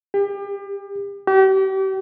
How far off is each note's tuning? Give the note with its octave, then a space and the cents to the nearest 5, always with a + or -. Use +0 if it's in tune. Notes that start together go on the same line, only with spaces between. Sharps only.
G4 +35
G4 -35